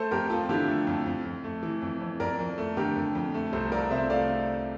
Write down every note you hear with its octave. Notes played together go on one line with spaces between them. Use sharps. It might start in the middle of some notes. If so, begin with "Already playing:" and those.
Already playing: A3 A4 C5
F2 G4 A#4
F3 F4 A4
D3 E4 G4
A3
F2
F2
F2
A3
E3
F2
F2
F2 A#4 D5
F2
A3
D3 G4 A#4
F2
F2
A3
C2 A4 C5
F3 A#4 D5
C3 C5 E5
A3 D5 F5